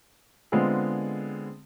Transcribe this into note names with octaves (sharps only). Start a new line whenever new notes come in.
D3 G#3 B3 C4 F4 G#4